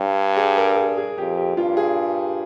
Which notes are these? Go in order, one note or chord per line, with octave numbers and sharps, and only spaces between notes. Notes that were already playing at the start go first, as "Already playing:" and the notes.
Already playing: G2
G#4
A#4
G#4
G#4
F2 G4
G4
G2 F4
G#4